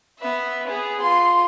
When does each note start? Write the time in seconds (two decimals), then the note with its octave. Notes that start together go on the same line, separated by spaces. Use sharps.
0.19 B3 E5
0.67 B3 G#4
1.00 F4 C6